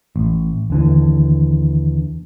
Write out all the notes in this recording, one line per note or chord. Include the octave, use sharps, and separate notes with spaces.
A1
D#2 D3 E3